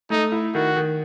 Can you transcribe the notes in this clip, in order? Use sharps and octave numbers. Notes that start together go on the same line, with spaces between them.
A3 D#4
E4
D#3 F#4
D#3